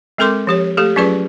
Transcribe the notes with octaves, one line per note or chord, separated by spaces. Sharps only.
G#3 C4 A4 A#4 C6 D6
F3 G4 C#5
A3 G4 A4
F#3 C#4 F4 G#4 B4 D5